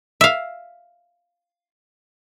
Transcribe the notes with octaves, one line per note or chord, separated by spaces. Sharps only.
E5 F5